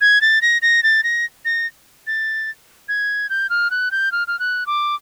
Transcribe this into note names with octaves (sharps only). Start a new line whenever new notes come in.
G#6
A6
A#6
A#6
A6
A#6
A#6
A6
G#6
G6
F6
F#6
G6
F6
F6
F#6
D6